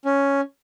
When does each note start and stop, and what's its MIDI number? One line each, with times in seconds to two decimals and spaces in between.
0.05 0.41 61